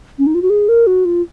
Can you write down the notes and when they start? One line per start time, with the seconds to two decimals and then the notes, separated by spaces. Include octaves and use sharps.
0.18 C#4
0.26 D#4
0.35 F4
0.42 F#4
0.50 G#4
0.68 A#4
0.87 F#4
1.05 F4